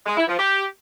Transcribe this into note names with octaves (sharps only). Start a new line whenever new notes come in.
G#3
E4
F3
G4